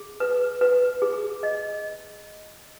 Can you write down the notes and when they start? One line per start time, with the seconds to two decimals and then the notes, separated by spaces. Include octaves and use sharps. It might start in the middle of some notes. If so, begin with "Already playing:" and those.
Already playing: G#4
0.20 B4
0.61 B4
1.02 G#4
1.43 D#5